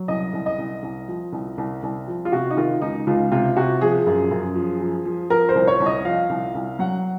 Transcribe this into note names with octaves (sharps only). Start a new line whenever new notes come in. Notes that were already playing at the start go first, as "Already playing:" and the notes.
Already playing: F#3
C2 D#5
C2
D#5
C2
C2
F3
C2
C2
C2
F3
F4
C3 F#4
D#4
D#3 F4
C#2 D#4
C#2 F4
C3 F4
C3 F#4
F3 G#4
F#2
F#2
F3
F3
F3
F3 A#4
C5
C2
C#5
C2
D#5
F3 F5
C2
C2
F#3 F#5